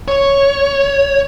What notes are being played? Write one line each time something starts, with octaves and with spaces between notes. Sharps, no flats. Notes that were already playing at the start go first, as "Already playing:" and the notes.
C#5